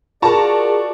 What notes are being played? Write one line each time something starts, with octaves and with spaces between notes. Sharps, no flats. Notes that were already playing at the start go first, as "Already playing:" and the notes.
F4 F#4 G#4 A#4 D5 A5 A#5 C#6